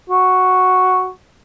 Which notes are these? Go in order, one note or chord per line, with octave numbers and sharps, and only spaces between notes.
F#4